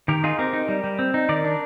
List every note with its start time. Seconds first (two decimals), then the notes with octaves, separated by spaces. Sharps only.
0.08 D#3 G4 A#4
0.24 D#4 F4 G#4
0.39 C4 G4 A#4
0.53 D#4
0.69 G3
0.84 G3
0.99 C4
1.14 D#4
1.29 D#3 A#4 D5
1.44 D4